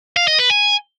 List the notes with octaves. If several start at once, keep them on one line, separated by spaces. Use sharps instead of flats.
F5
D#5
B4
G#5